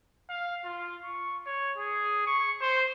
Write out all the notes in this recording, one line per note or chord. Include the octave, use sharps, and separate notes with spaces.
F5
F4
C#6
C#5
G#4
C#6
C5